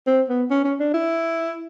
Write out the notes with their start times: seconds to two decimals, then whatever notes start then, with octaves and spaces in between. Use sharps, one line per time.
0.07 C4
0.29 B3
0.50 C#4
0.64 C#4
0.80 D4
0.94 E4